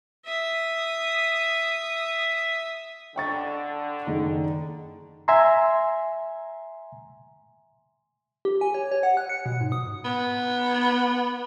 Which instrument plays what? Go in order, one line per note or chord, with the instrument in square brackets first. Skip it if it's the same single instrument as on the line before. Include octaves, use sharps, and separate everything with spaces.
[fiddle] E5 D#6
[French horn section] D3 [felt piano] G5 C#6 A6
[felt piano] F#1 D#3 D#4
[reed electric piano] E5 G#5 A#5 C6
[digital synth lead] G4
G#5
C#5
C#5
F#5
F#6
C#7
B2
G#2
D#6
[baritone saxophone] B3